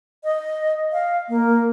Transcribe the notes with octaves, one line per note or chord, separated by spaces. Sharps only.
D#5
F5
A#3